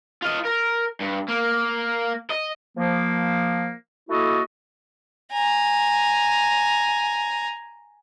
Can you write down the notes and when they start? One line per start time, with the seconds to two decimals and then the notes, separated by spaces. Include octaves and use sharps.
0.23 F4 D#5
0.45 A#4
1.00 G2
1.29 A#3
2.30 D#5
2.77 F3 A#3
4.09 A3 A#3 E4 F#4 A4 D#5
5.33 G#5 A#5